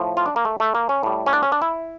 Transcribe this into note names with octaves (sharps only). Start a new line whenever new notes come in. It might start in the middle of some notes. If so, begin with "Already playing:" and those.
Already playing: A2 F3
F4
D4
A#3
A3
A3
A#3
C#4
A2 G3
C#4
D4
C#4
D4
E4